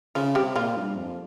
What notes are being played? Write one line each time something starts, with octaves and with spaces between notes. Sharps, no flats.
C#3 F3 F4
C3 G3 G4
A#2 F3 F4
G2
F2